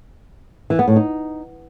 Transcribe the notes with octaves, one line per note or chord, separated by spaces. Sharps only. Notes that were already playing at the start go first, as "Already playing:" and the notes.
E3
B3
A2
D#4